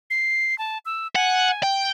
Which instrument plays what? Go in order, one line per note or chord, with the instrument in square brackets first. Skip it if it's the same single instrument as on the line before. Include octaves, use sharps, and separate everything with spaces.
[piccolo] C7
A5
E6
[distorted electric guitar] F#5 [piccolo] G#5
[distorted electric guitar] G5